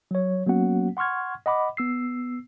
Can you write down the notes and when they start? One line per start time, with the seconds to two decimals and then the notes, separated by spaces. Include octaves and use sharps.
0.11 F#3 C#5
0.47 F#3 A#3 B3 C#4 F#4 F#5
0.97 F#5 C6 C#6 F6 G#6
1.46 D#5 F#5 B5 D6
1.77 B3 E6 C7